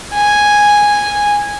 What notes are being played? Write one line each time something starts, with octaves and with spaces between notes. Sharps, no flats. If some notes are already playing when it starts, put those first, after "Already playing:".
G#5